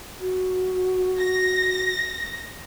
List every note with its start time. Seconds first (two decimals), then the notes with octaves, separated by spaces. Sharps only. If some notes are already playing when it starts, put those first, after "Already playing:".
0.21 F#4
1.19 A#6